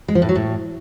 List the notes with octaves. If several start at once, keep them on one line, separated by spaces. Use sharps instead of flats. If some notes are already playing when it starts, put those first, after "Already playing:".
G#3
F3
A2
F#3
A2